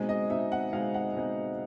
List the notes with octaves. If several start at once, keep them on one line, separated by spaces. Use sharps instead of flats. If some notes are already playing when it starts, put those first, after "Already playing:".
Already playing: B2 G#3 C4 D#4
D#5
B2 G#3 C4 D#4 E5
F#5
B2 G#3 C4 D#4 F5
F#5
B2 G#3 C4 D#4